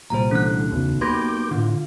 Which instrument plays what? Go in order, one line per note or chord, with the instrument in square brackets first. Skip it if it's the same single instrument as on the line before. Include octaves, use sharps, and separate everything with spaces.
[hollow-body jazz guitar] C2 A#2 G3 [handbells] C5 A#5
[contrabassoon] D3 [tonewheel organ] E3 A3 [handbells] C#4 F#6
[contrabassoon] B1 [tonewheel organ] E2 C#3
[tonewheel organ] A#3 D6 G6 [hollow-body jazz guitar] G4 B4 [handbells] C6 G#6 A#6
[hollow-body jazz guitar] A2 D3 [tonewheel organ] F4